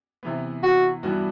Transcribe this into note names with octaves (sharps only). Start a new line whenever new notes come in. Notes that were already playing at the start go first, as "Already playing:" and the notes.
C3 E3 B3
F#4
G2 E3 G3 B3 F#4